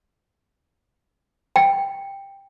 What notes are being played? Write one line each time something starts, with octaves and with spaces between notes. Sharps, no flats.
G5